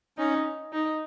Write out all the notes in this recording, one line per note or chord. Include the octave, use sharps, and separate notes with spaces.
C#4 D#4
D#4